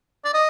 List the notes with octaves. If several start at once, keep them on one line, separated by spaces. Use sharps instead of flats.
D5
D#5